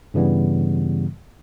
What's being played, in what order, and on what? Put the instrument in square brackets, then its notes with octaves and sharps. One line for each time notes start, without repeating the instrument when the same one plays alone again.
[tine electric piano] G2 C#3 E3 G3 B3